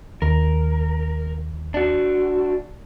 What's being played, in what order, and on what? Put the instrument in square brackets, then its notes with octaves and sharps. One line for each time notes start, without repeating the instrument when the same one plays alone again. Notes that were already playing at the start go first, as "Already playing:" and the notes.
[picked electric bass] D#2 [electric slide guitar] A#4
[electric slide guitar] D4 F#4